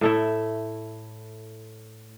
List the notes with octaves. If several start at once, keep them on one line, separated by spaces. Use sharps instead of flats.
A2 A3 E4